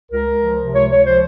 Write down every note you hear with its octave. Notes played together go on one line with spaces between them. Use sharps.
C#2 A#4
C#2
F3
C3
C#2 C#5
C#2 C#5
F3 C5